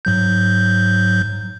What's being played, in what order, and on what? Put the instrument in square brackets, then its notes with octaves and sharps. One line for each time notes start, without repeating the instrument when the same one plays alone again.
[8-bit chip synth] G#2 F#3 G6